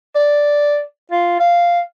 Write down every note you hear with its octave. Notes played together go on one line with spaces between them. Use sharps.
D5
F4
F5